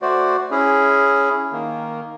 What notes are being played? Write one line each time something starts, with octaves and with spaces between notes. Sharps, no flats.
A3 F#4 C5 D5
C#4 E4 G#4
D#3 A#3